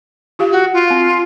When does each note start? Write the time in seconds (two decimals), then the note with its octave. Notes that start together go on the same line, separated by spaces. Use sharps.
0.39 F4 G4 F5
0.51 F#4
0.73 F4
0.90 C4